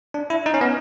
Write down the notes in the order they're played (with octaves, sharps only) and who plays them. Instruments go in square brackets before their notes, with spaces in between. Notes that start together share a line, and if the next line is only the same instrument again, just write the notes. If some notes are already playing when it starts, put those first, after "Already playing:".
[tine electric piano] D4
E4
D#4
C#4
B3